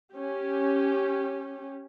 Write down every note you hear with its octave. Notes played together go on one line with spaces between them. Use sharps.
C#4 G4